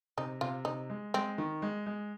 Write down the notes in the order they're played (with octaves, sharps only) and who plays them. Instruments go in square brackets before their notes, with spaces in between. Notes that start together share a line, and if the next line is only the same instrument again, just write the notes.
[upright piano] C3 [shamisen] D#4
[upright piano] C3 [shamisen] F4
[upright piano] C3 [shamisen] D#4
[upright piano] G#3
[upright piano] G#3 [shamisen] C4
[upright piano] D#3
G#3
G#3